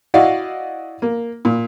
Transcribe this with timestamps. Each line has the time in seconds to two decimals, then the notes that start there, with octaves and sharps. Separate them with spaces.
0.14 E4 F#4 D5 D#5 F5 F#5
1.02 A#3
1.45 A#2